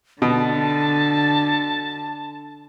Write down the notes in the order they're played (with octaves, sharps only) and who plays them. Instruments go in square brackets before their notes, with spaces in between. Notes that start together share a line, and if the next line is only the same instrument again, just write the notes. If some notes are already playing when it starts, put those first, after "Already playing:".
[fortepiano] B2 [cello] D3 [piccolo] A5